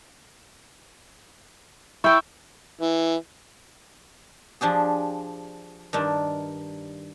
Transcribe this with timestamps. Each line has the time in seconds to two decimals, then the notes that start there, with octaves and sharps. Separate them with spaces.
2.04 E4 G5 C#6 E6 G6
2.80 E3
4.61 F3 D4 G4 G#4
5.93 G2 D#3 D4